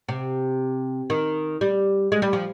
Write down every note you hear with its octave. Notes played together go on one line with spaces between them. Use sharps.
C3
D#3
G3
G#3
G3
F3